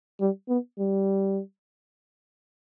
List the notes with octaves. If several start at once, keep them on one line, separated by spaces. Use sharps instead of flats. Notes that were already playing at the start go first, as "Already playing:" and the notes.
G3
B3
G3